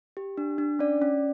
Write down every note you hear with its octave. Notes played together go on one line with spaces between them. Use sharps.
G4
D4
D4
C#4 D5
C#4